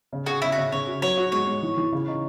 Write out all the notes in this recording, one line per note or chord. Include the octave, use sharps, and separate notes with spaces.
C#3
F#4 G#4
C#3 E4
F#4
C#3
C#3 C#5
F#4
F#3 C#5
F#4
G#3 C#5
G#3
E3
E3
C#3
D#4